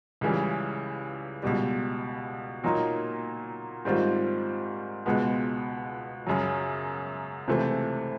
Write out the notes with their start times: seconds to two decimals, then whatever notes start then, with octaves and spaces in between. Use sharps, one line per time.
0.21 C#2 C#3 E3 G3
1.43 C#2 B2 G3
2.64 A#2 F#3 A#3 D#4
3.85 G#2 D#3 G3 C4 F4
5.06 C#2 B2 G#3 B3
6.27 F#2 C#3 F#3
7.48 C#2 C3 E3 A3 C4